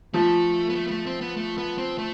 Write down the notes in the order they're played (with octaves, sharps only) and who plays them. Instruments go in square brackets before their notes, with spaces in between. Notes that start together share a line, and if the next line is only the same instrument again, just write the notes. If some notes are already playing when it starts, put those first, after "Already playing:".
[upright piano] F3 [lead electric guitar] A3
[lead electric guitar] B3
A3
B3
A3
C4
B3
A3
B3
C4
A3